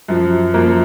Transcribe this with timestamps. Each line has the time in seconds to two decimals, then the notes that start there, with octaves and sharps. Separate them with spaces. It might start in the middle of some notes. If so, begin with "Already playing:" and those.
0.08 F#2 F3
0.54 F#2 F3 A#3